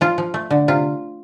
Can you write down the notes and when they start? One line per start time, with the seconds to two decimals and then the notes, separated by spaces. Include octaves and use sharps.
0.01 F3 F4
0.18 F3
0.34 A3
0.50 D3
0.68 C3 F4